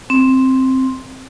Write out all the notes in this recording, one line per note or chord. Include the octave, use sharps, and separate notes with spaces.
C4